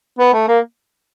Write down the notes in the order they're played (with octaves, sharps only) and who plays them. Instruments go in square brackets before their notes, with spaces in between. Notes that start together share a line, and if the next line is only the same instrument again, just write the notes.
[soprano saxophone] B3
A3
A#3